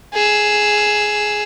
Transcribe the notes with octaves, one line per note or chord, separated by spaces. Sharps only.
G#4 E6